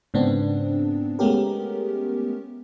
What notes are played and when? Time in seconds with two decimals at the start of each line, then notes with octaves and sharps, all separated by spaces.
0.14 G#2 C#3 B3 C4 D4
1.19 G#3 A3 B3 C#4 G4 A#4